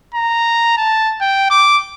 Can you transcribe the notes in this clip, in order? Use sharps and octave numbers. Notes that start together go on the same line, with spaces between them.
A#5
A5
G5
D6